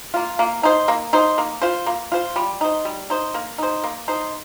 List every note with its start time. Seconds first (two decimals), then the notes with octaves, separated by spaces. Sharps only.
0.14 A#3 F4
0.39 A#3
0.63 D#4 C5
0.88 A#3
1.13 D#4 C5
1.38 A#3
1.62 F4 C5
1.86 A#3
2.12 F4 C5
2.36 G3
2.61 D#4 C5
2.85 G3
3.10 D#4 C5
3.34 A#3
3.58 D#4 C5
3.84 A#3
4.08 D#4 C5